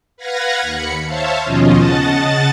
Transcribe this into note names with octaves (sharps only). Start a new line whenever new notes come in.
B4 F5 F#5 G#6 A#6
D#2 B5 C#7
C5 C#5 E5 F5 A5
D#2 B2 F3 C#4 F4 D#5
C#3 D#5 F#5 A5 A6